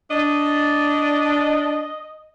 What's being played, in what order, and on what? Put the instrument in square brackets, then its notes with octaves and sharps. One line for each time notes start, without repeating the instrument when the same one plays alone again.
[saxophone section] D4 [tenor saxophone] D#5